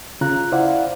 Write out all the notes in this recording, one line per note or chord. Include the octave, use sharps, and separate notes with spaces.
C#3 F4 A#5 F#6
E4 C5 D5 F5 F#5